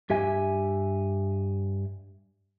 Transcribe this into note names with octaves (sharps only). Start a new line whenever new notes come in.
G2 G4 E5 G#5